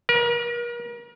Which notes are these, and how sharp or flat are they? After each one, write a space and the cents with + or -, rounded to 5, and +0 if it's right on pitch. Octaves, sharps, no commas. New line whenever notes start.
A#4 +40